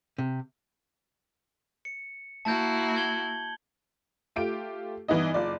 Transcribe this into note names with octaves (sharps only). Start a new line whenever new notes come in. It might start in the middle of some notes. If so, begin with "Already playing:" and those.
C3
C#7
A#3 E4 F#4 A5 G6
G#6 F#7 G7
A3 F4 G4 D7
G2 E3 B3 D#4 D#5
F#1 F4 D5